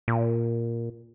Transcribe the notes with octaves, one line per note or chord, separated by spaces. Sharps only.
A#2